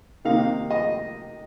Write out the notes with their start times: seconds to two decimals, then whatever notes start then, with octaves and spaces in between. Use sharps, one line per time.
0.25 C3 D#3 A#3 D#4 F5
0.70 D#5